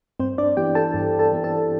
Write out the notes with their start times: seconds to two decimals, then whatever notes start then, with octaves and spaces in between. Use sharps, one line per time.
0.20 G2 C4 C5
0.38 D4 D5
0.57 E3 B3 E4 G4 G5
0.75 A4 A5
0.94 G2
1.19 A4 A5
1.32 E3 B3 E4
1.44 A4 A5